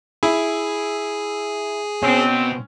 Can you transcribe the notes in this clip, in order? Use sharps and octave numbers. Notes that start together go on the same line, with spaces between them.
E4 G#4
B2 C4 C#4